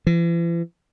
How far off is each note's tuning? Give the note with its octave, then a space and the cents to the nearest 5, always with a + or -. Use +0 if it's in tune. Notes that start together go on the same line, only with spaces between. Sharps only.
E3 +45